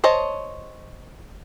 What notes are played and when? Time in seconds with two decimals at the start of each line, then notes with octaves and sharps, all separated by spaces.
0.04 C5 C#5 D#5 A5